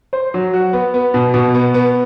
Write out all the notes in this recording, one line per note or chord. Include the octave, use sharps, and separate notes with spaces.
C5
F#3
F#4
B3
B3
B2
B2
B3
B3